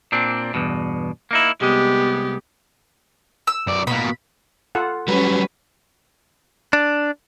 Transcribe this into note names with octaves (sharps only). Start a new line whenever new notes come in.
A#2 C4 D4
E2 G2 B2
A#3 D#4 E4
C2 G#3 B3 G4
E6
F#2 D5
B2 A#3 B5
F4 A4 F#5
F#3 G3 C#4 B4
D4